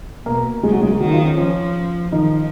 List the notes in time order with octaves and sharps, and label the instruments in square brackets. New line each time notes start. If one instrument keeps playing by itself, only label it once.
[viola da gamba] B2 [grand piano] A#3 A#4
[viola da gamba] C#3 [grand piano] G#3 G#4
[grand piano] F#3 F#4
G#3 G#4
A#3 A#4
[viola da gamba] D#3 [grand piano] F#3 F#4
[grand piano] D#4
F3 F4
C#4
[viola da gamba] F3 [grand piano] C#4
[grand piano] D#3 D#4 [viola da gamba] F3